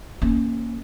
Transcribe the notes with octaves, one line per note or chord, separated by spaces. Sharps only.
A#3 C#4